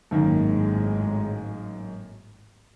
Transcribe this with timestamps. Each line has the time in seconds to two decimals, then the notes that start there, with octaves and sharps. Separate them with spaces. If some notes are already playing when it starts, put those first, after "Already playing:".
0.11 G#1 F#2 A2 D#3 G#3 A#3